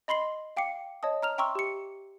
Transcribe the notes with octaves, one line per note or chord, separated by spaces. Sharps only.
D#5 B5 C6 C7 F#7
F5 G5 D6 C7 C#7
C#5 D#5 A5 D#6
A#5 F6 F7
E5 G5 A#5 C6 C#6 E6
G4 C#7